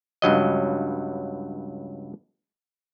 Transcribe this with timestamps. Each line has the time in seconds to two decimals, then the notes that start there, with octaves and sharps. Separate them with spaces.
0.22 C#2 G2 F#3 D#5